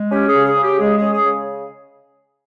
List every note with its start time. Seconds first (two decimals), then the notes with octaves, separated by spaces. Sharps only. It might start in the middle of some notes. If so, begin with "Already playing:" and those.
Already playing: G#3
0.11 C#4 G4
0.28 G#4
0.34 C#3
0.46 G#4
0.57 C#3
0.63 G4
0.79 G#3 G#4
0.97 G#4
1.02 C#4
1.14 G#4
1.25 C#3